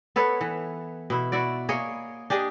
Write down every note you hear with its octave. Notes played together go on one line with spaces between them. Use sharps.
B3 A4 B4 C#5
E3
B2 E4
E4 F#4 D5
A#3 G#4 C#5 D#5
D4 G4 G#4 D#5